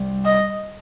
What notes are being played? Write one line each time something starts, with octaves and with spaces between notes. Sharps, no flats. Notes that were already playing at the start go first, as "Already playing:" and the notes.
Already playing: C2 G3
D#5